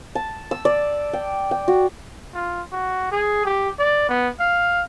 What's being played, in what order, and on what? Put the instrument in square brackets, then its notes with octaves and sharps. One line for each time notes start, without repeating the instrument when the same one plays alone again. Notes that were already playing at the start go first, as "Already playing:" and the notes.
[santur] A5
E6
D5
G5
G5
F#4
[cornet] F4
F#4
G#4
G4
D5
B3
F5